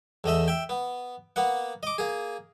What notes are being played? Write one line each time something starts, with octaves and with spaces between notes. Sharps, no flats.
E2 A3 D#5 E5
E5 G5
B3
A#3 B3 F#5
D#5 D6
A#3 G#4